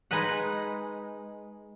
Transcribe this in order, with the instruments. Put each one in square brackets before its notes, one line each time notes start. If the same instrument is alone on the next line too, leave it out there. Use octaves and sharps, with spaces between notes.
[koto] G#3 D#4 B4 F#5